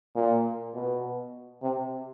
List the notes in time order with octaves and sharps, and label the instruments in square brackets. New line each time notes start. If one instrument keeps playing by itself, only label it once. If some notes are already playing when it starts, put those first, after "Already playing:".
[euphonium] A#2
B2
C3